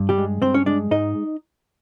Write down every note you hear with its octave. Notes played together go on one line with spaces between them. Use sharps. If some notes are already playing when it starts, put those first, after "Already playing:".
Already playing: G2
G3 G4
G#3
G2 C4 C5
C#4 C#5
G#3 D4 D5
G#2 D#4 D#5